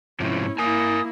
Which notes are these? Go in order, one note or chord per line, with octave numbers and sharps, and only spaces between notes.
G#2 C3 F3 C#4 E4
A#3 E4 A#4 G#5 D#6